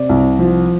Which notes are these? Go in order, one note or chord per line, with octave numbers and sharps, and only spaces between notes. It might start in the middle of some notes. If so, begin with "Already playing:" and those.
Already playing: C3 D5
C2
F3